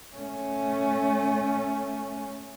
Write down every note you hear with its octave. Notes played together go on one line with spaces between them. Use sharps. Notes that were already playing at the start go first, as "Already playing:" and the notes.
A3 C#4